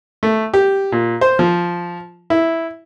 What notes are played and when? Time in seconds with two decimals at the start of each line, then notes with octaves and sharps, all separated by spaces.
0.23 A3
0.54 G4
0.92 A#2
1.21 C5
1.39 F3
2.30 E4